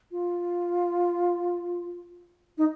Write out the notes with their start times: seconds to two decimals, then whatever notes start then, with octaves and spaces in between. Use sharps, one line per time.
0.11 F4
2.58 D#4